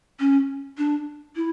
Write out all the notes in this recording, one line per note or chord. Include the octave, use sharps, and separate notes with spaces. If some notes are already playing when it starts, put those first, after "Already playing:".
C#4
D4
E4